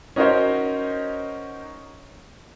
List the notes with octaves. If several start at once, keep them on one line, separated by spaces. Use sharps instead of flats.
C#4 D#4 F#4 A#4 C5 C#5